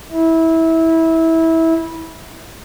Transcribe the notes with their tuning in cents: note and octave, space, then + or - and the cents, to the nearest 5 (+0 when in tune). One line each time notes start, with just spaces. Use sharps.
E4 -20